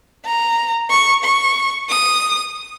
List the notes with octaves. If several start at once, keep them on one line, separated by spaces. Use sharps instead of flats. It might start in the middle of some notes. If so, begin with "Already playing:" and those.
A#5
C#6
C#6
D#6